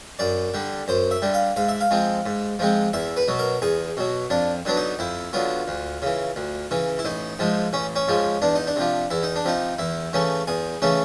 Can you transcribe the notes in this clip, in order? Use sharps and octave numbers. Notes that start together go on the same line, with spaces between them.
F#2 D5
D3 G3
F#2 C5
E5
D3 G3
F5
G#2 F5
E5
F5
F3 G#3 C4
G#2
F3 G#3 C4
E2 E5
B4
B2 F#3
A#4
E2 G#4
B2 F#3
F2 D4
D3 F#3 B3 D4
D#4
F2 E4
D3 F#3 B3 F4
D2
C#3 E3
D2
C#3 E3
E4
A1 D#4
G#2 F3 G#3
A1 C#4
C#4
G#2 F3 G#3
E2 D4
D#4
D4
C3 F3
E2 E4
D#4
D4
C3 F3 D#4
E2 E4
C#3 E3 A3 C#4
E2 G#4
C#3 E3 A3 C#4